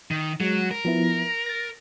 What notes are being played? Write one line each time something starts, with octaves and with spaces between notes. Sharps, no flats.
D#3
F#3 G#3
A#4
F3 B3 E4
A6 A#6